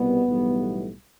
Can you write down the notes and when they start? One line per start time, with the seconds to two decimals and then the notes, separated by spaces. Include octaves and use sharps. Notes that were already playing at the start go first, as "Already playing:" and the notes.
Already playing: C2 B2 G3 B3
0.25 B1 A2 E3 G3